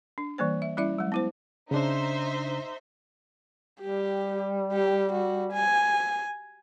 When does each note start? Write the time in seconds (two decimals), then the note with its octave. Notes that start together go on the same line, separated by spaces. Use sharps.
0.18 D4
0.38 E3 G3 A#3 C5
0.62 E5
0.77 G3 C#4 E4 D5 E5
0.98 F#3 G#3
1.12 B3 E4 C5
1.71 C#3 D4 D#4 C5 E5
3.81 G3 G4
4.73 G4
5.12 F#4
5.53 G#5